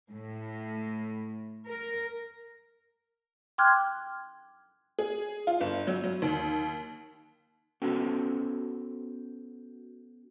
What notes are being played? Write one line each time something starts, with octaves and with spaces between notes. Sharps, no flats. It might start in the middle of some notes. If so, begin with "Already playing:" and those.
A2
A#4
G5 C6 D6 F6 F#6 G#6
G#4
F4
G1
F#3
F#3
D#2
B3 C#4 F#4 A4 C5 G5